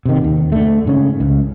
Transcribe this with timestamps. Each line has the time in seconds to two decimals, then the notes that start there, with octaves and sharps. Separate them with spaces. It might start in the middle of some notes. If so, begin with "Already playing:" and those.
0.06 C3 D#3
0.24 D#2
0.52 D3 A3
0.85 G#2 C#3 C#4
1.20 C#2